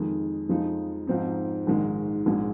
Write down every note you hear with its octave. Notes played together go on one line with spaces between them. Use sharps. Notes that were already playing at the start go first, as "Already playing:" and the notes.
Already playing: F2 D#3 G#3 D#4
F2 F3 G#3 D#4
G#2 F3 C4 D#4
A#1 G#2 D#3 G#3
A#1 G#2 G#3